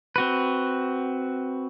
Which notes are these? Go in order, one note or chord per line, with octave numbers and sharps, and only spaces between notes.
C4 F#4 B4